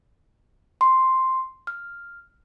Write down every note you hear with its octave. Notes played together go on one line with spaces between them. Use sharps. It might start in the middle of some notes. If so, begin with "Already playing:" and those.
C6
F6